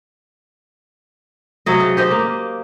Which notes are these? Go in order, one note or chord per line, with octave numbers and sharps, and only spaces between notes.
C3 F#3 D#5
C#3
G4 C5 D#5
A#3